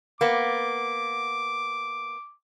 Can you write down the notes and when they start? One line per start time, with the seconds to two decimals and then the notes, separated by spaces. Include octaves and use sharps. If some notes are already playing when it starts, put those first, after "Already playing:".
0.21 A#3 B3 D6